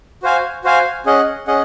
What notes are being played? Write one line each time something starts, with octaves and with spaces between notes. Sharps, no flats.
F#4 C5 F5 G#5
F#4 C5 F5 G#5
C#4 G#4 D#5 F#5
C#4 G#4 D#5 F#5